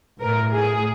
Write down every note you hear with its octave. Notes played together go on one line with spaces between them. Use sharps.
A2 A#4
G#4